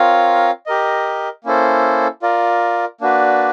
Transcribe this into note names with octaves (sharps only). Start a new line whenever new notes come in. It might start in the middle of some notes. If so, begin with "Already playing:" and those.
Already playing: C4 F4 A#4 C#5 F5
G4 A#4 D#5
A#3 C#4 E4 A4 C5
F4 A#4 D5
A#3 D4 F#4 B4 D5